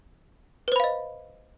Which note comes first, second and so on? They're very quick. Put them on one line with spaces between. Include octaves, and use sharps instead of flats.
B4 C5 B5 F5 D#5